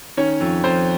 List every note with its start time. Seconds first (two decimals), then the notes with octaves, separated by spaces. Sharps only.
0.17 D#3 C#4 C#5
0.40 F2
0.64 F2 C5